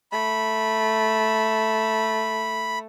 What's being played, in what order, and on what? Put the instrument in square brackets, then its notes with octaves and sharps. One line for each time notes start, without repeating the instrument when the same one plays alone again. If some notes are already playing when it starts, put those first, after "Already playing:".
[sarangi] A3 [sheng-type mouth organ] B5